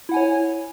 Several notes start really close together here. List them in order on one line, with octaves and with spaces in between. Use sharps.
E4 F#5 G#5 C#5